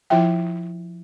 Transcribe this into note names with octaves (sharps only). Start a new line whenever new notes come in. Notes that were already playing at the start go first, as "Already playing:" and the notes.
F3 E4 F4 E5 G5